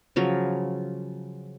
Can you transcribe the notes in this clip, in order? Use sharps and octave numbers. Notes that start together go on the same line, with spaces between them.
C#3 F3 F#3